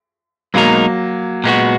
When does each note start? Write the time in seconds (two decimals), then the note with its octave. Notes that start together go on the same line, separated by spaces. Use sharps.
0.54 B1 B2 F#3 G#3 A#3 D#4 A#4
1.44 A#2 G#3 B3 F#4